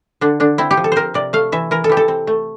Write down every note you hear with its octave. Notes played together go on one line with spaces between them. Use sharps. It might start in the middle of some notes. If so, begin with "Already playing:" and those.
D3 D4
D3 D4
C4 E4
G4
F3
A4
C4 A#4 C5
C3 D5
A3 F5
E3 E5
E3 A#4
A4
E3 G4
A4
C4
A3